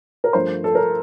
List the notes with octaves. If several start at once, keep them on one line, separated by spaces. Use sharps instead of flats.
A#4
G2 F3 A3 C5
A4
A#4